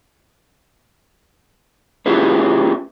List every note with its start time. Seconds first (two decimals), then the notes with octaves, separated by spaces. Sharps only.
2.06 C#4 E4 F4 G4 G#4 B4